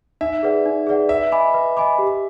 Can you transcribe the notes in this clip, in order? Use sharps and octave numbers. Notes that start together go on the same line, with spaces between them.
D#4 E5
G#4 B4 D5 F#5
D#4
G#4 B4 D5 F#5
B4 E5
D#5 G#5 B5 D6
B4
D#5 G#5 B5 D6
G4